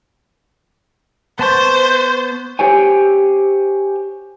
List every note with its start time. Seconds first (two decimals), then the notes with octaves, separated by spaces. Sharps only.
1.39 B3 C5 A5 C#6
2.59 G4 C5 C#5 G#5